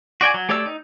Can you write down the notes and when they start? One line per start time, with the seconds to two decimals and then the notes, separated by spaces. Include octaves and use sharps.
0.21 F#4 D5 G5 G#5
0.34 F#3
0.49 A3 G4 C#5 D5 E6
0.66 D#4